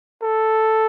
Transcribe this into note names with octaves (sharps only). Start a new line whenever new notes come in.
A4